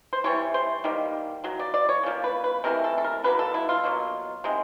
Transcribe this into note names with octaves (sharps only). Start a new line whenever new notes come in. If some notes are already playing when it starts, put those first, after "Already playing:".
C5
C3 E3 G3 C#5
C5
D#3 G3 A#3
C#3 F#3
D5
D5
C#5
C#3 F3 A#3
B4
B4
C3 E3 A3 A#4
A4
A4
A#4
D3 F#3 A#3 B4
A4
E4
F4
B2 F#3 A#3
C3 D#3 G#3